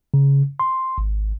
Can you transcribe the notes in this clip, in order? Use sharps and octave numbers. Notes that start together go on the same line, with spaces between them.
C#3
C6
G#1